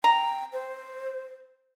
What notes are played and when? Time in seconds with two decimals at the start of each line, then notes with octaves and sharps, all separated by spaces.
0.04 G5 A#5
0.53 C5